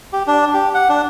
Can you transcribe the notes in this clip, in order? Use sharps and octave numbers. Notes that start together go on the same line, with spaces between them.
G4
D4
G4
F#5
D4